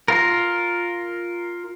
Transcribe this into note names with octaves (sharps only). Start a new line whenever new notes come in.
F4 A#4